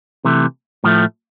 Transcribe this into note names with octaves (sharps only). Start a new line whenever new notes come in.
C3 E3 A3
A2 F3 A3